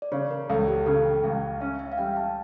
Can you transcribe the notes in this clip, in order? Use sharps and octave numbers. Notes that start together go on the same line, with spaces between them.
D5
C#3 C#5
A#4
C#2 A4
G4
C#3 A4
G5
C#2 F5
C#4 E5
E5
F5
G3 G5
A5